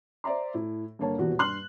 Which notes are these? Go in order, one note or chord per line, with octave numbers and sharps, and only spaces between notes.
C5 D5 E5 A#5 C6
A2
G2 D3 A#3 C#5 A5
D#1 E2 B2 F#4
G2 C6 F6 F#6 F#7